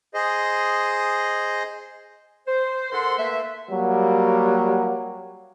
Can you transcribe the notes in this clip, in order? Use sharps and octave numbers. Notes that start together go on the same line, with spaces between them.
G#4 C5 D#5
C5
G#2 A4 A#4 F#5 C6
A3 A#3 B4 E5
F#3 G3 A#3 F#4